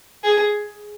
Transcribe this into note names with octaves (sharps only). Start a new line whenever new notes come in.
G#4